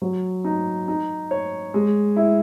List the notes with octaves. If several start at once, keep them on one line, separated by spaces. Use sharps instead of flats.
F#3
D#4
D#4
C#5
G#3
E4